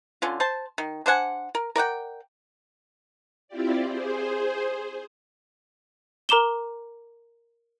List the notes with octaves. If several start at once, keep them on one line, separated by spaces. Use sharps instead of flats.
D3 C#4 F4
C5 A5
D#3
D4 C5 F#5 G#5
A#4
A#4 D5 F#5 G5
C4 E4 F4 G4 D5
G#4 C5
A#4 A#5 D6 E7 G7